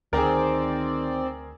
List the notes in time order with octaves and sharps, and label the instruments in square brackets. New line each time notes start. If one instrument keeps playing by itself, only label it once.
[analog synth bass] D2 [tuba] D#3 [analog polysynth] C4 D5 [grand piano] G#4 A#4